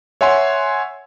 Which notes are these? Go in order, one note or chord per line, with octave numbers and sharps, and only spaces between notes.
C#5 E5 F#5 G#5 C6